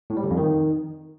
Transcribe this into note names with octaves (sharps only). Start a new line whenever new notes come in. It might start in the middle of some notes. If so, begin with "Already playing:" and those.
A2
G3
D3
F2
D#3